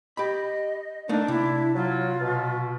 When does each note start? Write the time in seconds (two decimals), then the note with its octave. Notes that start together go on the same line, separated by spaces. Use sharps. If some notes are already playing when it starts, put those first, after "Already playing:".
0.17 G4 D#5 B5
1.09 A3 A#3 D4 D#4
1.28 C3 E4
1.75 F#3 F4
2.21 B2